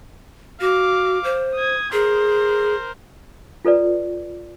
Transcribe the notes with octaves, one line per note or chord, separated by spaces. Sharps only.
F#4 F5 D6
C5
D#6 G#6
G#4 A#4 C5
F4 A4 B4 D5